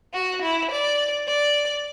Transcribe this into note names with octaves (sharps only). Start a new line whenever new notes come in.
F#4
E4
D5
D5